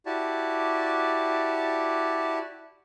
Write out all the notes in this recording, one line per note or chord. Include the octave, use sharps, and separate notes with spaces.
E4 F#4 G4 D5 A5